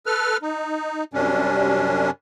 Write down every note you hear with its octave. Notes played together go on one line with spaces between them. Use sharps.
A4 B4 F6
D#4
F#2 C3 G3 C#4 D4